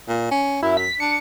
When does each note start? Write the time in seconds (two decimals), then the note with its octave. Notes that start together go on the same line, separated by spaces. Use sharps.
0.08 A#2
0.31 C#4
0.62 F#2 E4
0.77 B6
1.00 D4 C#7